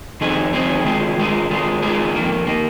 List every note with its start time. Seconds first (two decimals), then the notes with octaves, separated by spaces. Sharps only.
0.21 F2 D#3 C4 D#4 G#4
0.53 F2 D#3 C4 D#4 G#4
0.85 D#3 G#3 F4 G#4
1.17 D#3 G#3 F4 G#4
1.50 D#3 G#3 F4 G#4
1.82 D#3 G#3 F4 G#4
2.15 F2 D#3 A#3
2.47 D#3 A#3